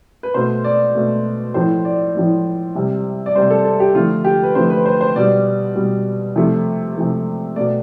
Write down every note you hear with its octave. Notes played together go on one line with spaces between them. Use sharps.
B4
B2 A3 C5
D5
B2 A3
A2 F3 A3 C5
D5
A2 F3 A3
C3 G3
D5
C3 G3 C5
A4
A4
G4
D3 F3 A3 F4
G4
B4
D3 F3 A3 C5
B4
C5
C5
B2 G3 D5
B2 G3
C3 F3 A3
C3 F3 A3
B2 A3 D5